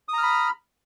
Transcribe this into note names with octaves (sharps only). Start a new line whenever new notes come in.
A#5 B5 D#6 F6